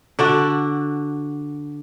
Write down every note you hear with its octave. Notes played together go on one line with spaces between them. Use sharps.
D3 D4 F#4